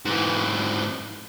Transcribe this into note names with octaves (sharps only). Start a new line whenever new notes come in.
G#2 E3